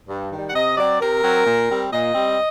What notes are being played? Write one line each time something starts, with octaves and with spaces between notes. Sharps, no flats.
G2
D#3 G3
F#5
C3 D#5
F#3 C4 D5
C3 A#4
F#3 C4
A#2
G3 C4
A#2 D#5
G3 C4